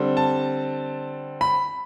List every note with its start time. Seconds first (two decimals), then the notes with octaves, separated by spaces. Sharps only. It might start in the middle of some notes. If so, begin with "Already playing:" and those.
Already playing: D3 G3 C4
0.17 A5
1.41 B5